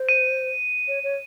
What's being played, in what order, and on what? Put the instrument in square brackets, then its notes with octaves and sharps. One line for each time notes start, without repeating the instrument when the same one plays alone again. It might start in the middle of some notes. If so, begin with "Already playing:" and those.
Already playing: [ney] C5
[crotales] D#7
[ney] C#5
C#5